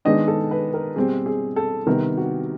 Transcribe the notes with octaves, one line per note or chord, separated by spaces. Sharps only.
D#3 G#3 B3 D4 D#5
A4
B4
A#4
B2 G3 C4 G#4
G#4
A4
C3 D#3 G3 B3 A#4
F#4